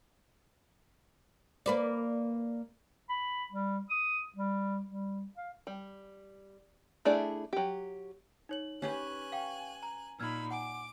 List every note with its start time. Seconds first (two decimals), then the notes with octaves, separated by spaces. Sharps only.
1.66 A#3 B4 D5
3.09 B5
3.52 G3
3.90 D#6
4.36 G3
4.86 G3
5.37 F5
5.67 G3
7.05 A3 D4 E4 G#4 D5
7.53 F#3 G4
8.49 D#4 C#5 F#7
8.82 C#4 G4 B4 G#5 F#6
9.32 F5 G5 C#6
9.83 A#5
10.20 A#2 D#4 B5 E6 F6 G#6
10.50 F#5 G#5 D6